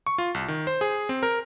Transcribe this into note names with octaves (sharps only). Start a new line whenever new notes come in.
C#6
F4
C2
D#3
C5
G#4
C4
A#4